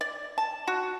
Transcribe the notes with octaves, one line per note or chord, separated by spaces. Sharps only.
D5
A5
F#4